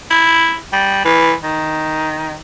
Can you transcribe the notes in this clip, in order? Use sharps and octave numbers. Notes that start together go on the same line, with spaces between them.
E4
G3
E3
D#3